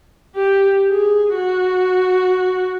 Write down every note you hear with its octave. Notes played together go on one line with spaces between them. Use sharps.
G4
G#4
F#4